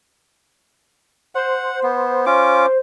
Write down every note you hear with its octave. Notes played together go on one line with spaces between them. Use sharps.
C5 F#5
B3
C#4 F4 D6